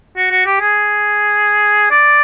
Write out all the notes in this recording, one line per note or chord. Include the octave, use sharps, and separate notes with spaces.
F#4
F#4
G4
G#4
D5